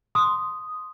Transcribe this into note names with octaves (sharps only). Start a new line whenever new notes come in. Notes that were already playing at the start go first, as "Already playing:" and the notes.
C6 D#6